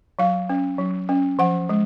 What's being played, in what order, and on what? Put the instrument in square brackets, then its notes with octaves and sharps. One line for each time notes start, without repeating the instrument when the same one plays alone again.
[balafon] F#3 F5
C#4
F#3
C#4
F3 F#5
G#3